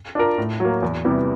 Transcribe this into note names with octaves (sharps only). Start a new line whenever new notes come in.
D4 F4 A#4
A2
F#3 A#3
E2
C3 E3 G3 B3